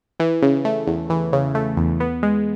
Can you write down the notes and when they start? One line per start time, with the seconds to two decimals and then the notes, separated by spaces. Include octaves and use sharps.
0.20 E3
0.42 C#3
0.65 A3
0.87 E2
1.10 E3
1.33 C#3
1.55 A3
1.77 E2
2.00 B3
2.23 G#3